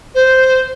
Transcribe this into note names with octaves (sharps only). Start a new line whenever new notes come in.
C5